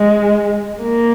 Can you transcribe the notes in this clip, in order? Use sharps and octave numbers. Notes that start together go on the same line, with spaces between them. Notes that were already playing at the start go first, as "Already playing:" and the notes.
Already playing: G#3
A#3